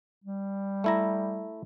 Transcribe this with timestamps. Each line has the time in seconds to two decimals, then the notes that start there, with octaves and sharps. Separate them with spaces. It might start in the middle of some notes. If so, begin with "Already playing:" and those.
0.24 G3
0.84 A3 E4 A#5